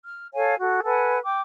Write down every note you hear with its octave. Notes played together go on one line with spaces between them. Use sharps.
F6
A4 C#5 F5 G#5
F#4 A4
A4 B4 F#5 G#5
G5 D6